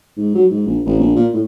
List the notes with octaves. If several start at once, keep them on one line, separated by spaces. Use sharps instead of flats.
G#2
F#3
G#2
A#1
A1
A#1
A#2
A2